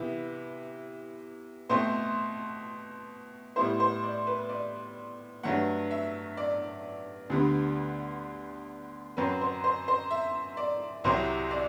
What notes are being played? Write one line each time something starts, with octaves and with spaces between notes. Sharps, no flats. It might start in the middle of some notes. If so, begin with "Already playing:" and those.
Already playing: C3 E3 B3 E4 B4
B2 A3 C4 C5
A2 G3 B3 E4 C5
C5
D5
B4
D5
G2 F#3 A3 F#5
E5
D5
D2 D3 G3 B3
F#2 F#3 C4 B4
C5
C5
C5
E5
D5
C2 C3 F#3 C4 E4 C5
D5